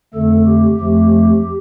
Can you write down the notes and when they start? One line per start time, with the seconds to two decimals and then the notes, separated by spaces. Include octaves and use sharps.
0.14 F2 D3 A3 A4
0.46 G4
0.79 F2 F3 A3